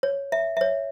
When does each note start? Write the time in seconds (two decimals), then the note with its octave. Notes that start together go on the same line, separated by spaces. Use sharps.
0.03 C#5
0.32 E5
0.57 E5
0.61 C#5